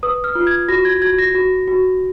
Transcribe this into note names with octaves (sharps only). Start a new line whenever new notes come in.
B4 D#6
F6
F4
G#6
F#4 A#6
G#6
F#4 G#6
A#6
F#4
F#4